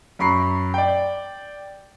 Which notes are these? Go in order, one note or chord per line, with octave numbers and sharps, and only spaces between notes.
F#2 A#5 B5 C#6 C7
D5 G5